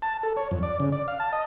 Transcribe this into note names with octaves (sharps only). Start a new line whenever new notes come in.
A5
A4
C#5
F2
D5
C#3
D5
F5
A5
D#5